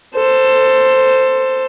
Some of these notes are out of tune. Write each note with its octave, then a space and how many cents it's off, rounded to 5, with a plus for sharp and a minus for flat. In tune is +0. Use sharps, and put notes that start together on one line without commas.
A4 +20 C5 +0